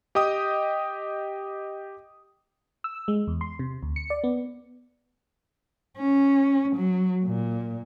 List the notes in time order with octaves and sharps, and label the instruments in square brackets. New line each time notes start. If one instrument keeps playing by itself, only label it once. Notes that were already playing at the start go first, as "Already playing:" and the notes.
[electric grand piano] G4 D#5 G5 D#6
[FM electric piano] E6
G#3
E2
C6
C3
D2
C#7
D5
B3
[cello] C#4
F#3
A#2